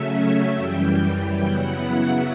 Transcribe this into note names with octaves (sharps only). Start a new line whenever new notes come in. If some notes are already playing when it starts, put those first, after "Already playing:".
Already playing: C#3 F#3 A3 C#4 E5
F#2 E3 G3 G5
G5
C#3 F#3 B3 E4 F#5